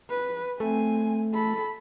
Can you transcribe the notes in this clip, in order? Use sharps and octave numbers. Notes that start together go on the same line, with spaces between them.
B4
A3 C4 G#5
A4 B5